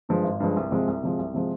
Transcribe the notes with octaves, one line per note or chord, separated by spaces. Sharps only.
G2 F3 G#3
G#1
G2 F3 G#3
C2
C3 F3 G#3
C2
C3 F3 G#3
C2
C3 F3 G#3